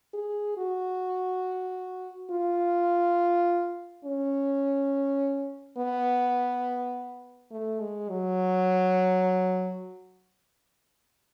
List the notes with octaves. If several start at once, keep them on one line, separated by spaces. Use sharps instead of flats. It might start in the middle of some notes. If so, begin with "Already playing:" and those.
G#4
F#4
F4
C#4
B3
A3
G#3
F#3